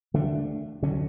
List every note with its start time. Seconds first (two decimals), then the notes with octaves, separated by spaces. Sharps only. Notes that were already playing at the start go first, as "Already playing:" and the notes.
0.14 D2 D3 A3 D4
0.82 D2 D3 F#3 C#4